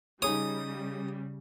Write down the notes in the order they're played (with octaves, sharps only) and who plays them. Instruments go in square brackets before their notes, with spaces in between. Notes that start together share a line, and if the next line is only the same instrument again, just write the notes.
[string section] C#3 G3 [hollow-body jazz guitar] D#4 G#4 C#5 [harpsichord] D#6